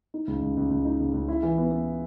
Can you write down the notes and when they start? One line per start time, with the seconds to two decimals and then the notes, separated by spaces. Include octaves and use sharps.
0.14 D#4
0.27 C#2
0.42 C#2
0.57 C#2
0.70 C#2
0.85 D#4
1.00 C#2
1.13 C#2
1.28 E4
1.43 E3
1.58 B3
1.71 B3